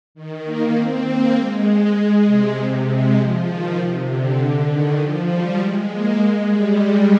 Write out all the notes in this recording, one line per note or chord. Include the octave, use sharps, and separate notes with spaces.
D#3
A#3
C4
A#3
G#3
C3
G#3
F3
D#3
C3
D3
D#3
F3
G3
G#3
A#3
G#3
G3